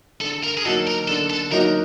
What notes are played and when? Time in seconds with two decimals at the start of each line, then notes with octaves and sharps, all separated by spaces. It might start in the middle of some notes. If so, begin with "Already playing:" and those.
0.21 D3 A4
0.44 A#4
0.57 G#4
0.65 F#3 A#3 D#4 F#4 A4
0.87 A#4
1.08 D3 A4
1.30 A4
1.51 F#3 A#3 D#4 F#4 A#4